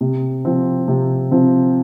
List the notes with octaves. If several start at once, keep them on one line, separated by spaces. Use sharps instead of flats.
C3
F3 C4
C3
F3 C4